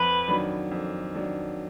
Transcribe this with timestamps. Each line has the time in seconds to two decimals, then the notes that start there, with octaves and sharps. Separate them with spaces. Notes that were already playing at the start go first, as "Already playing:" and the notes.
Already playing: F2 B4
0.27 D#3 F#3 D4
0.71 F2
1.14 D#3 F#3 D4